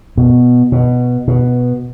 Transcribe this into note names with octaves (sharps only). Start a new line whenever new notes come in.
B2
B2
B2